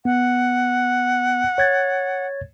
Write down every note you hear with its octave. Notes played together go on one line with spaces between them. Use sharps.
B3 F#5
C#5 G#6 A6